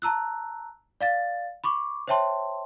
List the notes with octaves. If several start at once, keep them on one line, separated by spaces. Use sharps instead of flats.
A5 A#5 E6 F#6
D5 F5 A6
B5 C#6 D6
C5 C#5 E5 G5 A5 C6